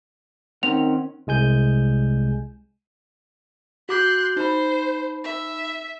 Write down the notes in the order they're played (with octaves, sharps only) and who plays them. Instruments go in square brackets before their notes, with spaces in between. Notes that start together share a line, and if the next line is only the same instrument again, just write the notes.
[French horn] D#3 [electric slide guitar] C4 C#4 F#5 [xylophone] F7
[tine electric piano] C2 G#3 G#5 G6
[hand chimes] F#4 D6 G6 [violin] C6 F#6
[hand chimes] D#4 B5 [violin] C5
[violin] E5